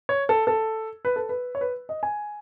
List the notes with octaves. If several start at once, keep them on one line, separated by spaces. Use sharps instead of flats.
C#5
A4
A4
B4
A4
B4
C#5
B4
D#5
G#5